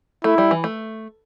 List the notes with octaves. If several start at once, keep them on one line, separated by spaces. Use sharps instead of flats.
A3 E4
G3
E3
A3